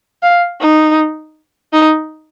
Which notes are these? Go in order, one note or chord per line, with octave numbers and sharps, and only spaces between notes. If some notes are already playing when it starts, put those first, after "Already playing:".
F5
D#4
D#4